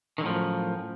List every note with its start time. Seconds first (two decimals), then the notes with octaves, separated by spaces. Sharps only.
0.18 D#3
0.21 D3
0.23 A2
0.26 F3
0.28 F#2